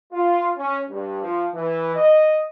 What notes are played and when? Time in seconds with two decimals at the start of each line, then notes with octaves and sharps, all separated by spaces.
0.12 F4
0.57 C#4
0.89 G2
1.22 F3
1.54 E3
1.94 D#5